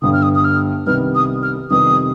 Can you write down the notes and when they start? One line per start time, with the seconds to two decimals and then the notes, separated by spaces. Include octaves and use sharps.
0.02 G1 G2 D3 D#6
0.13 F6
0.23 D#6
0.35 D#6
0.44 F6
0.86 C2 C3 D#3 G3 B3 F6
1.15 D#6
1.43 F6
1.70 F2 C3 D#3 G3 B3 D#6